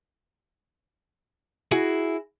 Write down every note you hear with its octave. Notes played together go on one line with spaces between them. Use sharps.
E4 F#4 G#4